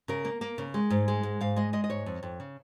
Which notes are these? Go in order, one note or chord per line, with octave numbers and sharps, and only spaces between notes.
C#3 A#4
A#3
A#3
C#3
G#3
G#2
G#3
G#2
G#2 F5
G#3 D#5
G#3 D#5
D#5
G#2 C#5
F2
F2
C#3